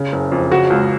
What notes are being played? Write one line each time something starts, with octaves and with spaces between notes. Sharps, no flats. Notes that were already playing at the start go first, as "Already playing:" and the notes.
Already playing: C#3
F#1
F2
C#3 F#4
C#2